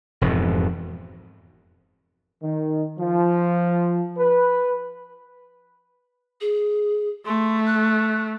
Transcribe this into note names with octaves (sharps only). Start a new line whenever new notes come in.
E1 F2 G#2 B2
D#3
F3
B4
G#4
A3 C6
F#6